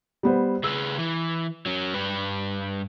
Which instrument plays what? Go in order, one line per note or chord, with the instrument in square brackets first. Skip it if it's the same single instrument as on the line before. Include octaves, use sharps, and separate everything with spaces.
[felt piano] G3 B3 C5
[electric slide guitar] C#3 G#4 B4 [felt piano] E6
[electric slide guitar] E3
F#3 C#4
G2 G3 B4